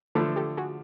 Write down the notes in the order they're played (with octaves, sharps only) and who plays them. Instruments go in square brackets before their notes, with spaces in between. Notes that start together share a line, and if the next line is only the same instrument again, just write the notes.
[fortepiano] D3 F3 A3 [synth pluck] A4 B4
[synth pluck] G4 A4
F#4 G#4